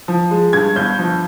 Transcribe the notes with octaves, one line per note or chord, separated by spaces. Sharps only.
F3
G#3
G2 G#6
G1 G6
F3